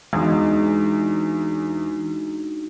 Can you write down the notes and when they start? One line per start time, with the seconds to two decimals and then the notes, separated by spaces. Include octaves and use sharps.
0.13 E2 G#3 D4 D#4 F#4